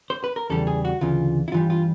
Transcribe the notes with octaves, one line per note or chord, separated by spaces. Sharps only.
C5
B4
A#4
E2 C#3 E3 G3 A4
G#4
F#4
D2 C#3 E3 F4
E4
G2 E3 G3 F4
F4